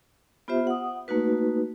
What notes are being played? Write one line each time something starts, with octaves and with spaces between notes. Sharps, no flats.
B3 F4 G4 C5 E5
F#5 D#6
A3 A#3 D#4 F#4 B4